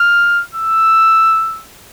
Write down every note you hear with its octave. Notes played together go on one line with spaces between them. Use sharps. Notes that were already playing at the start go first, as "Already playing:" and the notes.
Already playing: F6
E6